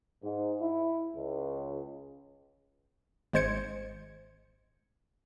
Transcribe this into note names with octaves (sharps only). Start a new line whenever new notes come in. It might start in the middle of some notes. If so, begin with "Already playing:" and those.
G#2
E4
C#2
G#1 G#3 C5 G#6 C#7